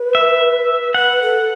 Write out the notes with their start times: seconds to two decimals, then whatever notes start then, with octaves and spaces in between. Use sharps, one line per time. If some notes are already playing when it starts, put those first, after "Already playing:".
Already playing: B4
0.15 E5
0.94 B4 F#5
1.22 A4